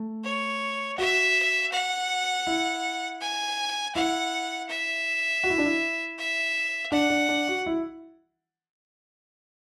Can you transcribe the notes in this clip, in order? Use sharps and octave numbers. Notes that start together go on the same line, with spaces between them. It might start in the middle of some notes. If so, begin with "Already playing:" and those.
Already playing: A3
C#5
F#4 E5
F#5
E4
G#5
E4 F#5
E5
F#4
E4
D4
E4
E5
D4 F#5
D4
D4
F#4
E4